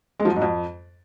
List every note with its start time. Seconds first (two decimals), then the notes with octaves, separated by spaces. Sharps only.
0.20 G#3
0.25 F3
0.31 F#3
0.36 G#2
0.42 F2